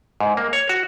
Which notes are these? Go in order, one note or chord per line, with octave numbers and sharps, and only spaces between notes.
G#2
A#3
C#5
F#4